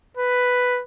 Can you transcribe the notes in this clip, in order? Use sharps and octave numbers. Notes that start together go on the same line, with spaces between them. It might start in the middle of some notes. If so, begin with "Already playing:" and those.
B4